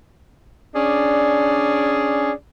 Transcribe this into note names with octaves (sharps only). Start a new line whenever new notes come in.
C#4 D4 G#4 D5